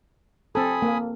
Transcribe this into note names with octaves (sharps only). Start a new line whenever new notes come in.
C4 A4 G#5 B5 D#6
A#3